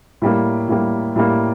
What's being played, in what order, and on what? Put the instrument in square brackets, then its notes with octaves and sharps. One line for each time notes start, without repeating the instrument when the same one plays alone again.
[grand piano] A2 G3 A#3
A2 G3 A#3
A2 G3 A#3